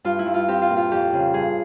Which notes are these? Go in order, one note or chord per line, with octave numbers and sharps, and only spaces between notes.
G2 F4
E4
G2
F4
C4 G4
F4
A#2
F4
F2 G4
C#3
G2 G#4